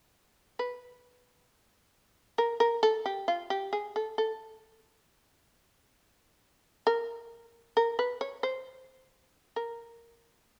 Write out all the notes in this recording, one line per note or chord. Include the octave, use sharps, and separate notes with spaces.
B4
A#4
A#4
A4
G4
F4
G4
G#4
A4
A4
A#4
A#4
B4
C#5
C5
A#4